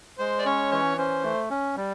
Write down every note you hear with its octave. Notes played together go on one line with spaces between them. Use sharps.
G#3 C5
D5
C#4 C#5
E3 C#5
C#4 C5
A3
C#4
G3